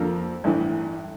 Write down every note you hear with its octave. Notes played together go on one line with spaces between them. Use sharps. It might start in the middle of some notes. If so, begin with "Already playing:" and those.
Already playing: F2 D3 F3 A#3
A1 G2 E3